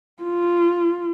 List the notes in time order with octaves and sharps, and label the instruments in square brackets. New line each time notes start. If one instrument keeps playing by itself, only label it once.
[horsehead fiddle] F4